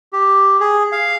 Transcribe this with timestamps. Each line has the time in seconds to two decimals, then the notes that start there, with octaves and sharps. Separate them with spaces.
0.13 G4
0.60 G#4
0.92 F5